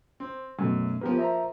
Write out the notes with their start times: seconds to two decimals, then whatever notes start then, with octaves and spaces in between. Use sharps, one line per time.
0.20 C4
0.59 F#2 B2 A3 C#4
1.01 F3 A#3 B3 G4 B4
1.17 C5 E5 A#5